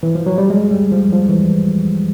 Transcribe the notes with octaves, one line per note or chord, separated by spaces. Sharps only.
E3
F3
F#3
G3
G#3
G3
F3
F3
E3